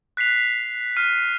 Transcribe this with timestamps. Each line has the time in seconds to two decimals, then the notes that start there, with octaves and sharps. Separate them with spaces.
0.17 F#6 B6 C7 F7
0.96 F6 C7 D#7